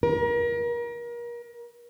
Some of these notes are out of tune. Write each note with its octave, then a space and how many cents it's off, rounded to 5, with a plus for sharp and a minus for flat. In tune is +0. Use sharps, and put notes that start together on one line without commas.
A#4 +35